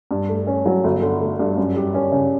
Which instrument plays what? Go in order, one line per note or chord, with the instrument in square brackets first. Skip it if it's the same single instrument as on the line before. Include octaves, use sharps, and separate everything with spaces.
[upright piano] G2
A3
C#4
F#3
G1
D3
A3
G2
F#2
G3
C#4
C#3